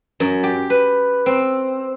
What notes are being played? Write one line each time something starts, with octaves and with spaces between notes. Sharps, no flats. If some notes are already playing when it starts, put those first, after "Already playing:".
F#2
G4
B4
C4